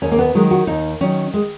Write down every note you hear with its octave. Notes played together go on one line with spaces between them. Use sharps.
D#2 C#4
A#3
B3
D#3 F#3 G#3
F#4
D#2 D#4
D#3 F#3 C#4
G#3